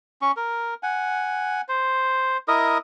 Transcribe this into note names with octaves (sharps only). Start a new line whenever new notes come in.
C#4 C#6
A#4
F#5 G#5
C5
E4 A#4 D#5 D#6